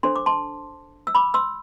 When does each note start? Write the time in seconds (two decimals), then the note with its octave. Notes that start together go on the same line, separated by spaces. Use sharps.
0.03 D4 A4 C5 C6
0.16 D6
0.26 A5 C6
1.07 E6
1.15 B5 D6
1.34 C6 E6